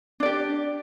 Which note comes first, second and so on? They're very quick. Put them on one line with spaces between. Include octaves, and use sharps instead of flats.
D4 D5 G4